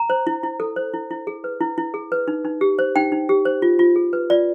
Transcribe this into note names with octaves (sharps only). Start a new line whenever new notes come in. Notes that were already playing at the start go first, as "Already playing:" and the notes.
Already playing: A#5
C5
E4
E4
A4
C5
E4
E4
G#4
B4
E4
E4
G#4
B4
D#4
D#4
G4
C5
D#4 G5
D#4
G4
C5
F4
F4
G#4
B4
F4 D5